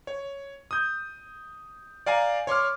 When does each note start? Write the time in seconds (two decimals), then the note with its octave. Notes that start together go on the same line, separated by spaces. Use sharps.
0.07 C#5
0.71 D#6 G6
2.06 D5 F5 G#5 A#5
2.47 C#5 C6 D6 F6